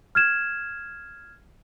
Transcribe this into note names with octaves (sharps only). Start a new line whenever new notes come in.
F6 G#6 E7